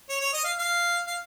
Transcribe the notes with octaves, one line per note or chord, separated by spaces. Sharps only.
C#5
C#5
D#5
F5
F5
F5